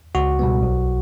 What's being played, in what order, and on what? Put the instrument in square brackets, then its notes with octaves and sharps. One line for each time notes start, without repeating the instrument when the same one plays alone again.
[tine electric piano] C#2 F#4
B2 G3 B3
B1